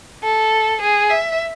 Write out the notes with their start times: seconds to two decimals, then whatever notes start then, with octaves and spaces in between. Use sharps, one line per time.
0.23 A4
0.82 G#4
1.10 E5